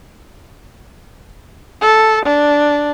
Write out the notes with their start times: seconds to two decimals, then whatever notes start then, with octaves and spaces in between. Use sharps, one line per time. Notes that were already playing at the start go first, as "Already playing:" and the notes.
1.81 A4
2.25 D4